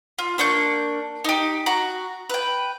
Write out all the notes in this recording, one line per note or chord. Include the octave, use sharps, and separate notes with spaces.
F4
A#3 D4 C#6 G6
D#4 G4
F#4 A#5
B4 G5